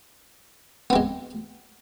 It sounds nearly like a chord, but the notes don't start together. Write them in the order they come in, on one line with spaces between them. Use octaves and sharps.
B3 C4 G#3